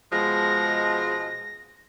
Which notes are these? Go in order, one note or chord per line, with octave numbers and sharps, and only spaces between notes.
B2 F3 G#3 A#6